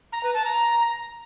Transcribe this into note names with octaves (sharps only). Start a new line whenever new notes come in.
A#5
B4
A5
A#5